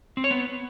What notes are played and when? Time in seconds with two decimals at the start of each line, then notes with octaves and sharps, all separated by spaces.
0.17 C4
0.24 C#5
0.31 B3